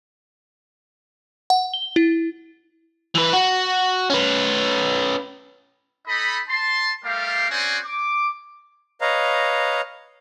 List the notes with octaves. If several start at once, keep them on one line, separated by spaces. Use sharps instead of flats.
F#5
G7
E4
E3 B4
F#4
C#4 B4
D#4 A4 D#5 B5
A5 C6
G3 A3 G4 A#4 F5
C4 C#4 F#4 C5 D5 G#5
D6
B4 C#5 D#5 F5 A#5